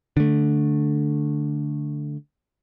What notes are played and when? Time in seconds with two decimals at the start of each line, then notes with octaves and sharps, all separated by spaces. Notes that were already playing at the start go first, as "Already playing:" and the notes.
0.17 D3 A3